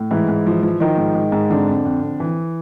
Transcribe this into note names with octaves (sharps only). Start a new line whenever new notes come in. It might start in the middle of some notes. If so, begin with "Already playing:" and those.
Already playing: A2
G#2 E3 E4
G#2
F3
F3
D#3 F3 D#4
G#2
G#2
G#2
F2 D3 D4
F2
F2
F2
E3